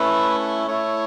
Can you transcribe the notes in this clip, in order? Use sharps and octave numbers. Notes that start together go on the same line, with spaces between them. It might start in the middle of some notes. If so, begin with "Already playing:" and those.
Already playing: A3 C#4 E4 B4
A3 E4 C#5